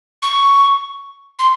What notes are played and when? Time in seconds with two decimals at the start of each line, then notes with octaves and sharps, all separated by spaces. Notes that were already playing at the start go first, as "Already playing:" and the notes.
0.22 C#6
1.39 C6